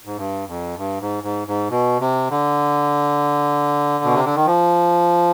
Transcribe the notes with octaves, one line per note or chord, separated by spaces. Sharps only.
G#2
G2
F2
G2
G#2
G#2
G#2
B2
C3
D3
B2
C3
D3
D#3
F3